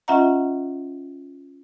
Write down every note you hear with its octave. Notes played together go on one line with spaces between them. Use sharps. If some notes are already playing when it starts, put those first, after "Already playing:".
C#4 F4 D#5 E5 F#5 A#5